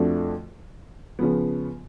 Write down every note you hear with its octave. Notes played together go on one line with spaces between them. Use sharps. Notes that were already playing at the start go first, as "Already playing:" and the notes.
Already playing: F2 F3 A3 D4 F#4
C#3 F3 B3